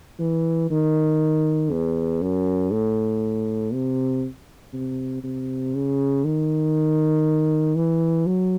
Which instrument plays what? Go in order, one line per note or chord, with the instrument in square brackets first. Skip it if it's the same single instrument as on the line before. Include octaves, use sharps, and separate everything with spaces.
[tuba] E3
D#3
E2
F#2
A2
C3
C3
C3
C#3
D#3
E3
F#3